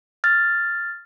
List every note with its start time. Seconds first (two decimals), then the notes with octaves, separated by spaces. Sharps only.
0.24 F6 A6